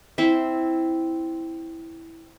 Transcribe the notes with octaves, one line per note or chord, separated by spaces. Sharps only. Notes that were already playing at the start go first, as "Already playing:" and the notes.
C4 E4